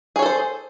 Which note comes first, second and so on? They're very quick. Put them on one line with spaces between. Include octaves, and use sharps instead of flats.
G#4 C#5 A4 C5